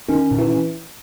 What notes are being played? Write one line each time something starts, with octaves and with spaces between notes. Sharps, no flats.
D#3 C#4
A#2
E3